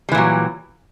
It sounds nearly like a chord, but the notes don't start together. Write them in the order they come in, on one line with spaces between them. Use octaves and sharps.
G3 E3 A#2 F#3